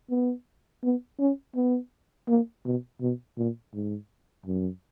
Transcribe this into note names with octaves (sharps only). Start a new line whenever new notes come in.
B3
B3
C#4
B3
A#3
B2
B2
A#2
G#2
F#2